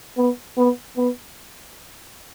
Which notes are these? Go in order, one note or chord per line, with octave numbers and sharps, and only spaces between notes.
B3
B3
B3